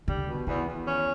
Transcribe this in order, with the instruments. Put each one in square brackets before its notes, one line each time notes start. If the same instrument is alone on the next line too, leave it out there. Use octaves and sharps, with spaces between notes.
[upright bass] D3 [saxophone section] G3
[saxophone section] B2
[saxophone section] E2 [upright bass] D#3
[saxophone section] E2
C#4